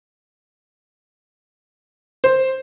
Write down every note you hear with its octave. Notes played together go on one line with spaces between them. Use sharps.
C5